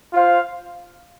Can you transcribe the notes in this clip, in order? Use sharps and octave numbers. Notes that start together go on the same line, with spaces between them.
F4 C5 F5